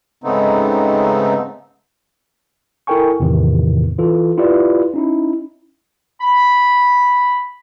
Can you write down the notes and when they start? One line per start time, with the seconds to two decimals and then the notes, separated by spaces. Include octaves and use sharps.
0.24 G#2 C#3 A3 B3 C4 D#4
2.87 E4 A4 A#4 G5 G#5 C#6
3.20 E2 A2 C3 D#3 E3
3.98 E3 F4 A4
4.38 E4 F4 G4 B4 D5
4.94 C#4 D#4 E4
6.21 B5